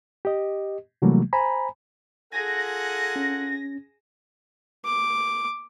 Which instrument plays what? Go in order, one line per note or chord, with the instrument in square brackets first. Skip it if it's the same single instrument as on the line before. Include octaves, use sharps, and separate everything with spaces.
[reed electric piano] G4 D#5
C3 E3 F#3 G3 A3 A#3
C5 G#5 A#5 B5
[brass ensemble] F4 A4 F#5 [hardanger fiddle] G#4 G#5 [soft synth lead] A#6
[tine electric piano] C#4
[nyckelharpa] D6